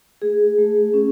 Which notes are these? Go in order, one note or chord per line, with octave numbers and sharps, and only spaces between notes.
A3 G#4
A3
C#4